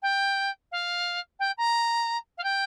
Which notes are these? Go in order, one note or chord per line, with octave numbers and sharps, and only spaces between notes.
G5
F5
G5
A#5
F5
G5